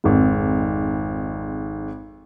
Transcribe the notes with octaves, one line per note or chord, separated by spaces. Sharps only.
G#1 F2 G#2